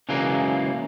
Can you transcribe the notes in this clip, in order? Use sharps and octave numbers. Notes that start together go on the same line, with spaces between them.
C#3 E3 F#3 G#3 A#3